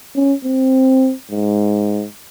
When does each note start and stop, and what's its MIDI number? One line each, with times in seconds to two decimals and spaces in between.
0.15 0.34 61
0.44 1.13 60
1.31 2.05 44